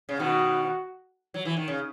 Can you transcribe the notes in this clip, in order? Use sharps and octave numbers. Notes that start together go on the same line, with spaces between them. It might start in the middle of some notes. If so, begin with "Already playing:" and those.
C#3
B2 D#3 F#4
F#3
E3
D#3
C#3